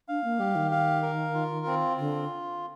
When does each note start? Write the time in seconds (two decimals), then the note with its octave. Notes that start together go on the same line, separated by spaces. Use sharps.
0.08 D4 F5
0.24 A#3
0.39 G3 G4
0.55 D#3
0.71 F5
1.02 A#4
1.34 F4
1.66 C4
1.97 D3 F4